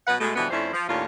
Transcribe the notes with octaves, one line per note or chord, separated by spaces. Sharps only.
B2 F#3 B4 D#5 F#5
B2 G#3 A3
B2 D3 E3 F3 G3 B3
F2 A3 C#4 D4 E4 C5
F3
D#2 A2 C#4 D4 F4